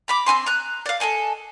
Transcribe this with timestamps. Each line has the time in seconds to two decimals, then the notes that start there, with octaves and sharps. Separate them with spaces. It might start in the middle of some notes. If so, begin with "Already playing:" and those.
0.08 A#5 B5 D6
0.26 C4 C#4 G#5 C6
0.46 A#5 F#6
0.86 D5 F5
1.00 A4 D#5 G#5 A#5